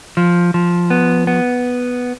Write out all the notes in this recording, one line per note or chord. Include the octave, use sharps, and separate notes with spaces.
F3
F3
B3
B3